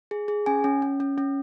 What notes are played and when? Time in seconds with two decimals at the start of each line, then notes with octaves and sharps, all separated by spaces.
0.11 G#4
0.28 G#4
0.46 C#4 G#5
0.64 C#4
0.82 C#4
1.00 C#4
1.18 C#4